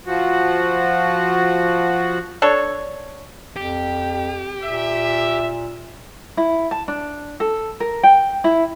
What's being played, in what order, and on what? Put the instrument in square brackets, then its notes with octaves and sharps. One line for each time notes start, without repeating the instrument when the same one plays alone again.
[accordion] F3 F#4
[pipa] D4 A4 C#5
[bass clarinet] F2 [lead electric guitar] G4
[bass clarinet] A#2 [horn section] E5
[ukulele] E4
A5
D4
A4
A#4
G5
E4